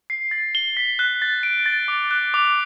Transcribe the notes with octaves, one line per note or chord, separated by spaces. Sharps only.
C7
A6
G7
B6
F#6
A6
D7
A6
D6
F#6
D6